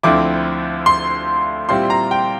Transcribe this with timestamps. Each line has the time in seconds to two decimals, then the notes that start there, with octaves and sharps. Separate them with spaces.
0.03 D2 D3 F3 C4 E4 D6
0.86 C6
1.69 A#2 G3 C4 E4 C6
1.90 A#5
2.11 G5